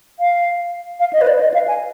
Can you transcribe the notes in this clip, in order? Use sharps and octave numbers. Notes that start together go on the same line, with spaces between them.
F5
F5
D#5
B4
D5
D#5
F5
G#5